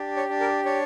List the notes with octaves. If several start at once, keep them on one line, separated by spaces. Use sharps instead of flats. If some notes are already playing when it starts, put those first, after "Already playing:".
Already playing: D4 G4
C#5
D4
A#4
D4 C#5